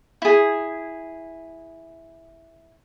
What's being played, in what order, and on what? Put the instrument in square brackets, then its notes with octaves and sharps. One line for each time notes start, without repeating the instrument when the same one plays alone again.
[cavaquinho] E4 G#4